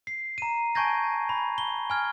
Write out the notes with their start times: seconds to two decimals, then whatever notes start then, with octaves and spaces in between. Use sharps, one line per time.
0.07 C7
0.38 A#5 D#7
0.75 G#5 A5 C#6 G6 G#6 A#6
1.29 B5
1.58 G7
1.90 G#5 F6 G#6